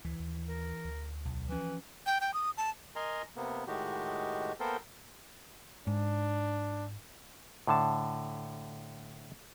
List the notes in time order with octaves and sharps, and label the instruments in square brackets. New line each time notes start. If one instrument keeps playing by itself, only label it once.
[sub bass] D2 [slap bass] E3
[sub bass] D#2
[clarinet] A#4
[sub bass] D2
[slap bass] B1
[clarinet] E3 [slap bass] F3 C#4
[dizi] G5
G5
D#6
A5
[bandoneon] A#4 D#5 G#5 A#5 C6
C3 A#3 B3
A2 D#3 G#3 F#4 G4
A#3 B3 A4 A#4 C5 G5
[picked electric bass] G#2 [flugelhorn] D4
[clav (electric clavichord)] A2 D3 A5